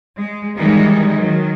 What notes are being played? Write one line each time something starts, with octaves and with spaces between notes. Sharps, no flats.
G#3
D#3 E3 G3 G#3 D#4
D#3 F#3